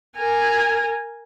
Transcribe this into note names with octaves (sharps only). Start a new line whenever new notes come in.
A#4 G#5